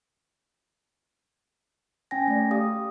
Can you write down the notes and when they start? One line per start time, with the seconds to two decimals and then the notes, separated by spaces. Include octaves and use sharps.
2.11 C#4 G5 G#5 A#6
2.28 A3 D5
2.51 G4 D5 F5 D#6